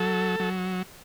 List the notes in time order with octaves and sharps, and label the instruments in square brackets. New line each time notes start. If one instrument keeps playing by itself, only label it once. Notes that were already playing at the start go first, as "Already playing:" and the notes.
Already playing: [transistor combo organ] F#3 A4
F#3